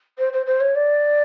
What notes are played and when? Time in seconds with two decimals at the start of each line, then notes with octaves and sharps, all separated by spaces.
0.18 C5
0.33 C5
0.46 C5
0.60 C#5
0.75 D5